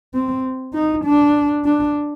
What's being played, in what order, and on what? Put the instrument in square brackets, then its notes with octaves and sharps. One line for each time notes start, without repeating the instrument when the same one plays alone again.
[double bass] C4
D#4
D4
D4